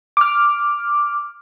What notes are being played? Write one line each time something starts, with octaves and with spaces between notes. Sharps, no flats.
D6 F6